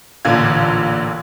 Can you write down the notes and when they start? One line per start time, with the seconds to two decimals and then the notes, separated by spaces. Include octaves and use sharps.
0.25 A1 A#2 D3 F5 G#6